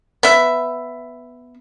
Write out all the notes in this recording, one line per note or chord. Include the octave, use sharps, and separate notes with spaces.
B3 E5